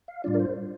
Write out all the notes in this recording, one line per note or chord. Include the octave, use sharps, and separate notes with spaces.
F5
A2 G3 D4 F4 D5
A#4
C5